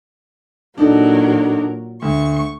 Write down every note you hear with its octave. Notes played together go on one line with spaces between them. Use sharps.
A#2 F#3 D4 D#4 A4 A#4
D2 C#6